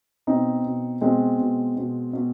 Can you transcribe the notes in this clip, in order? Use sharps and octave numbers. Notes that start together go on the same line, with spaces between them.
B2 C4 D#4
B2
B2 G#3 C4
B2
B2
B2